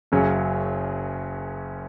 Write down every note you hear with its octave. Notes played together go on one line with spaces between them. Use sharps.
F#1 F#2 C#3 F#3 C#4